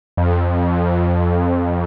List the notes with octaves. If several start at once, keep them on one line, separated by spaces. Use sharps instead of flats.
F2